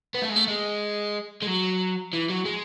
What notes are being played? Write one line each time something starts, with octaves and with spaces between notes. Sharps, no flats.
B3
A3
G#3
A3
G#3
G#3
F#3
E3
F#3
G#3